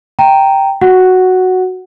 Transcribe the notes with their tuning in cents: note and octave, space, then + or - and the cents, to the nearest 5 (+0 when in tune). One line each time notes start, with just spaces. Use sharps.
G5 +0 A#5 -10
F#4 +0 F#5 +5